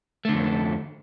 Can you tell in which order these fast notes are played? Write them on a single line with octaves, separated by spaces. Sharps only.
A3 D3 F2